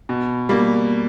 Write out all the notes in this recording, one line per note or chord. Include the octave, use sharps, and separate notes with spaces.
B2
G3 A#3